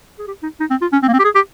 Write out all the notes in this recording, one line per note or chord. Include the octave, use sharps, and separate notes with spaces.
G#4
G4
D#4
D#4
C4
F4
C#4
C4
A#3
C4
G4
G#4
G4